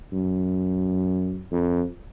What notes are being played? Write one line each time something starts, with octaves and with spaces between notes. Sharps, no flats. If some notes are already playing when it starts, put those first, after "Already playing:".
F#2
F2